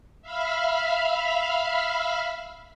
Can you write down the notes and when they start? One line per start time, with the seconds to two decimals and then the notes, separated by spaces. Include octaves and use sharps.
0.22 E5 F5 B5 F6